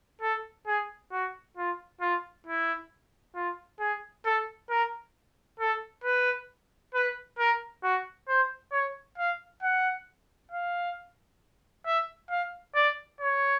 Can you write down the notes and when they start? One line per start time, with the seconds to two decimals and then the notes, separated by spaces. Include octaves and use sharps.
0.22 A4
0.67 G#4
1.12 F#4
1.57 F4
2.01 F4
2.47 E4
3.35 F4
3.80 G#4
4.25 A4
4.70 A#4
5.60 A4
6.04 B4
6.94 B4
7.39 A#4
7.83 F#4
8.28 C5
8.72 C#5
9.18 F5
9.63 F#5
10.51 F5
11.86 E5
12.30 F5
12.75 D5
13.20 C#5